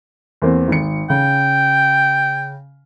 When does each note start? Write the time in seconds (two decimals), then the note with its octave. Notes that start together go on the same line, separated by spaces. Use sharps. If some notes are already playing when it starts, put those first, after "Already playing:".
0.42 E2 A#3 C4
0.68 G#1 C#7
1.10 C#3 G5